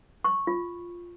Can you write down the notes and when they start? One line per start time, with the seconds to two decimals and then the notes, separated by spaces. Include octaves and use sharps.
0.24 C#6
0.47 F4